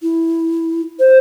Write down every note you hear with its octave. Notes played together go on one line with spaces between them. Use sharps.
E4
C5